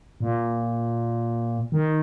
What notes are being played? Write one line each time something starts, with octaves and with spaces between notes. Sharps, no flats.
A#2
D#3